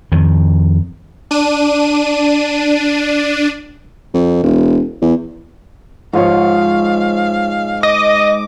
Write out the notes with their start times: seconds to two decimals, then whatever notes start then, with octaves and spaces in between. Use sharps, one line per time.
0.12 F2 D#3
1.31 D4 D#7
4.14 F2
4.43 E1
5.02 E2
6.13 G#2 F3 F4 C#5 F5 C#6
7.83 D#5 D6